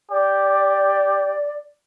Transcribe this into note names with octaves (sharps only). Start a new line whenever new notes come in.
G4 D5